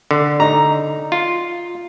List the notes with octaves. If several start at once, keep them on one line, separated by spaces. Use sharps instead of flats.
D3
D#4 A#5
F4